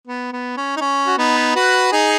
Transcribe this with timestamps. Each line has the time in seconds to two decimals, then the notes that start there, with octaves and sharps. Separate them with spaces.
0.08 B3
0.33 B3
0.57 C#4
0.77 D#4
0.81 C#4
1.07 F#4
1.18 B3 D#4
1.55 F#4 B4
1.92 D#4 G#4